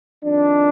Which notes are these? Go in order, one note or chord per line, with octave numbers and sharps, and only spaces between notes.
F2 D#3 D4